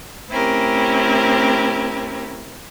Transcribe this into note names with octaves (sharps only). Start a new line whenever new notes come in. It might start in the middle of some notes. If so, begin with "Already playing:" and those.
A3 C4 C#4 E4 G4 A#4